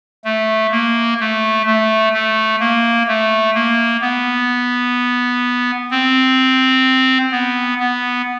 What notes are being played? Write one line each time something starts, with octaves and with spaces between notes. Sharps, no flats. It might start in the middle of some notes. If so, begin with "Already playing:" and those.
A3
A#3
A3
A3
A3
A#3
A3
A#3
B3
C4
B3
B3